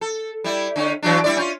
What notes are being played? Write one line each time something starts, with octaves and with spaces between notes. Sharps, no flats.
A4
G3 E4
D3 C#4
E3 F#3 D4
G3 E4 D5
C#4 F4